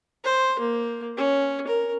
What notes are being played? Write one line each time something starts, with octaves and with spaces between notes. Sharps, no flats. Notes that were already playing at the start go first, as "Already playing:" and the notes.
C5
A#3
C#4
A#4